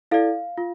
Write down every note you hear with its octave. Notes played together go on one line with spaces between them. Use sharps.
E4 A4 D5 F5
F4